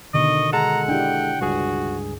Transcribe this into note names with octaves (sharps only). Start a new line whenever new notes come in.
B2 D3 D#3 D#5 C#6
G#3 A4 F#5 A5 A#5
D4 E4 G4 G5
C#2 G2 F#4 G#4